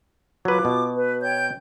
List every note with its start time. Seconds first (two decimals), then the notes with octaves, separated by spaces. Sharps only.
0.45 F#3 F4 B4 D6
0.65 B2
0.95 B4
1.22 C#5 G5 G6